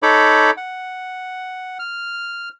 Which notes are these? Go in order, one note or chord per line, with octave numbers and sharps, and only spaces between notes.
D#4 A4 C#5 B5 D6
F#5
F6